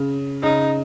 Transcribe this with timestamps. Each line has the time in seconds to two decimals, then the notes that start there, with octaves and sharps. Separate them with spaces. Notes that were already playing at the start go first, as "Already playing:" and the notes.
Already playing: C#3
0.43 C#3 D#4